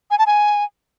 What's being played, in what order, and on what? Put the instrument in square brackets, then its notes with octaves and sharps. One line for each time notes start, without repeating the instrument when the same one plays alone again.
[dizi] G#5
A5
G#5